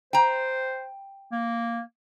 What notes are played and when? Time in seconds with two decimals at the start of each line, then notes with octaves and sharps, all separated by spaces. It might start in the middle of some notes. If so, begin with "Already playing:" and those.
0.13 C5 G5 A#5
1.32 A#3